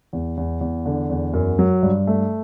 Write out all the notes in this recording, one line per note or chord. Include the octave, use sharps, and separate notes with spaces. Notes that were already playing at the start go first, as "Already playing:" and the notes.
E2
E2
E2
D3
E2
F#2
F#3
G2
A3